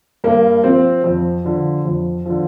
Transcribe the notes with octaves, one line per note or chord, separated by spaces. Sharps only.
G2 A#3
F3 C4
F2
D3 F3
F2
D3 F3